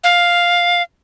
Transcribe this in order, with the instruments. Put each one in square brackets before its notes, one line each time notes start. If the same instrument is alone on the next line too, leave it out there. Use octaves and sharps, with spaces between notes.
[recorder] F5